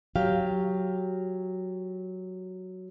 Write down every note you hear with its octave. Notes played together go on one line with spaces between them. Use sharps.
F#3 G4 F5